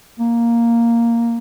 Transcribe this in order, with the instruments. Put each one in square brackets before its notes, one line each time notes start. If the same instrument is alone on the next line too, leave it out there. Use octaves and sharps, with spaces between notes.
[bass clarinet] A#3